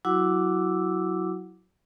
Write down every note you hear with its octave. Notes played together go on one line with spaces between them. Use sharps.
F#3 E4 F#4 F#5 D6 E6